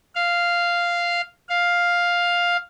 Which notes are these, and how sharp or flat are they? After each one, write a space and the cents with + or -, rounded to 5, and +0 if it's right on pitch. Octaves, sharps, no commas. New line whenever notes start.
F5 -5
F5 +5